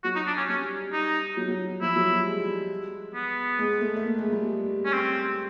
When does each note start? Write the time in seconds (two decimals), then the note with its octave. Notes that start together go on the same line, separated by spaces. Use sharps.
0.04 F#3 F#4
0.15 D#4
0.26 D4
0.37 C#4
0.49 G3 C#4
0.92 D#4
1.37 F#3
1.48 F#3
1.81 F3 E4
1.96 F#3
2.11 G3
2.25 G#3
3.14 B3
3.59 G#3
3.81 A3
3.97 A3
4.03 A#3
4.18 G#3
4.32 G3
4.85 C#4
4.92 C4